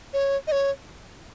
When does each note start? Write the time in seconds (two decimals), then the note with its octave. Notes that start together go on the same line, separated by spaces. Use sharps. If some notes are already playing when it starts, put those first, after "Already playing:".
0.13 C#5
0.47 D#5
0.52 C#5